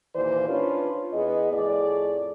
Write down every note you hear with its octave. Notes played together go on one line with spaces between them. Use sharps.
D#2 A#2 E3 C5 D5
C#4 D4 F4 B4 C#5
E2 B3 G#4 D#5
F2 A2 G#4 D5